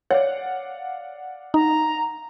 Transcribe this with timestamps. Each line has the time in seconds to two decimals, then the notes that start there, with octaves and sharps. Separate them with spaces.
0.11 C#5 D5 F5 F#5
1.54 D#4 A#5